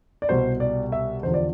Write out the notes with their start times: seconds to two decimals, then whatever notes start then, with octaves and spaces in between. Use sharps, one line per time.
0.22 D5
0.29 C2 B2 C5
0.60 D5
0.92 E5
1.23 E2 D3 F3 C5
1.34 D5